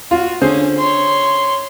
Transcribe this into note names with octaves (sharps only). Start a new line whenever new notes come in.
F4 F#4
D3 C#4 G#4 C5
C#5 C6